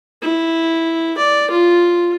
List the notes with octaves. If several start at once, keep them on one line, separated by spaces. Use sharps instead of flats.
E4
D5
F4